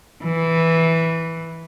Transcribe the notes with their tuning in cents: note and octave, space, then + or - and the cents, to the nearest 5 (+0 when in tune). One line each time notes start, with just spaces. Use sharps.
E3 -5